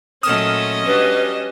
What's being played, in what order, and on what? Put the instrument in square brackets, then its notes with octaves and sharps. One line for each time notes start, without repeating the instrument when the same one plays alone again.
[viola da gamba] A#2 F#3 A3 [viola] C#4 D#5 [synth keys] D#6 F6 E7
[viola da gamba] G3 D4 F#4 [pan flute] B4